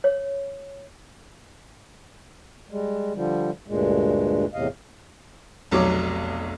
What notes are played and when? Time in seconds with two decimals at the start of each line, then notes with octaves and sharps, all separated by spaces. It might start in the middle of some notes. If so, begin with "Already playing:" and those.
0.04 C#5
2.71 G3 G#3
3.15 D3 F3 G3
3.68 D2 G2 A#2 G#3
4.54 E2 A2 C3 D#5 F5
5.71 F1 B1 F#3 C#5 D6